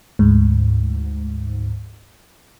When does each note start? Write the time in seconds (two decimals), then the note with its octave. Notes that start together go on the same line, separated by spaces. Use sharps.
0.19 D2 G#2